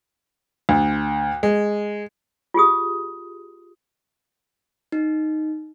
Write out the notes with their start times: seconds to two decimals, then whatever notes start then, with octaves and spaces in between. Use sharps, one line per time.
0.69 D2
1.43 G#3
2.54 F4 G4 G#4 D#6
4.92 D#4